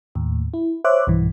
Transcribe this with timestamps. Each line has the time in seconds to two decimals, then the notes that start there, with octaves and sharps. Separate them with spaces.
0.15 D#2 A2
0.54 E4
0.84 C5 C#5 E5 D6 F#6
1.07 B1 G2 E3